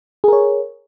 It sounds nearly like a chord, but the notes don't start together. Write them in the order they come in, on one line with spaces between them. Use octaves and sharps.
G#4 A#4 C#5